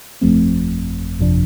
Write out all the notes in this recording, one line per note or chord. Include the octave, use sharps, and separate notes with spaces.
G1 F2 F3 A3 C4
G1 F2 C3 F3 D4